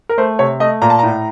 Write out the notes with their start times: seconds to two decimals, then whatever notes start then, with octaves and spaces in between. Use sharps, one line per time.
0.09 A#4
0.18 A3 C5
0.39 C3 C#5
0.60 A3 D#5
0.82 A#2 A#5
0.90 A5
0.99 A2 A#5